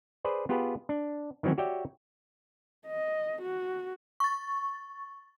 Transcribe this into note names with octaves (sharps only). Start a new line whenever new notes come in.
G#4 B4 C5 D5
B3 F4 G4 G#4 B4
D4
D#3 E3 F#3 C4 C#4
F#4 G4 C#5 D5 E5 G5
D#5
F#4
C#6 A6